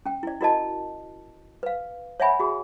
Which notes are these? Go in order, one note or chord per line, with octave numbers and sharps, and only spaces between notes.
C#4 G5
E4 D5
E4 F#4 A#4 D5 D#5 A5
B4 F5
C#5 D5 E5 F#5 G#5 B5
F#4 G#4